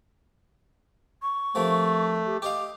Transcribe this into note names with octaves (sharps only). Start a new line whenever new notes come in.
C#6
C3 F3 A3 A#3
G4
G4 D#5 F5 D6